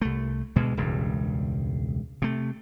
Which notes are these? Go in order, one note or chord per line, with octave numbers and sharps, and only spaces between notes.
C2 A3
D2 B2 G#3
E1 C#2 G2
C3 A3